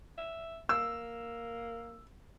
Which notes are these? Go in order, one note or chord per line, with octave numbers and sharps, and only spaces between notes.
E5
A#3 E6